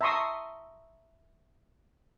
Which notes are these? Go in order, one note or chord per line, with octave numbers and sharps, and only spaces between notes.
E5 A5 A#5 C6 C#6 D#6